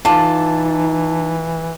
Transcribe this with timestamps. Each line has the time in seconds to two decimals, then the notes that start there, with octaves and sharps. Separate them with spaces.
0.05 E3 D#4 F4 A4 D5 A5